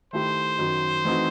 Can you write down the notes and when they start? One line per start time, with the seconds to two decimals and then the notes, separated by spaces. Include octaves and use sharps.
0.13 D#3 A3 E4 G4 C5
0.59 F#2 D#3 F#3
1.05 E3 A3 C4 D#4 F#4